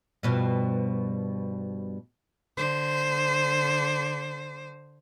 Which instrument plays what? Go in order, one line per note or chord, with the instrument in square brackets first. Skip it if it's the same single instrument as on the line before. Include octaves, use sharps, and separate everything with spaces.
[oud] G2 B2 F3
[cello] D3 C5